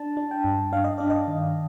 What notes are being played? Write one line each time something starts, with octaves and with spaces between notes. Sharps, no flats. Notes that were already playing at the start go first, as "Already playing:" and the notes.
Already playing: D4 A5
D4
G5
G2
D4 F5
D#5
D4 D5
D#5
D#3